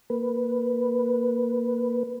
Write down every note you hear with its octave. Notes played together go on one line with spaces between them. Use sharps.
A#3 B4